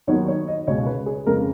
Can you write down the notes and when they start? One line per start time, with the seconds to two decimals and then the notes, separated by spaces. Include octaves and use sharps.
0.07 D#2 D#3 F#3 B3 C#5
0.28 C#5
0.48 D#5
0.67 C#2 B2 G#3 C#5
0.87 B4
1.06 G#4
1.26 F2 C#3 G#3 A#4